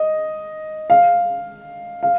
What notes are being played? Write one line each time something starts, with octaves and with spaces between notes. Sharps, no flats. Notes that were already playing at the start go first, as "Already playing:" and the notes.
Already playing: D#5
F5
F5